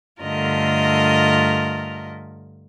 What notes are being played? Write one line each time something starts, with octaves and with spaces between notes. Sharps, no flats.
G2 D3 A3 F4 A#4 D#5